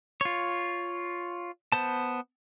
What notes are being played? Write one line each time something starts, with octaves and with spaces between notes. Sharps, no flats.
F4 C#5
B3 C5 A5